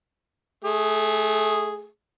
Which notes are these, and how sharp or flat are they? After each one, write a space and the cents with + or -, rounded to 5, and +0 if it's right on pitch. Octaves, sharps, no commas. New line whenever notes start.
A3 -25 G#4 +0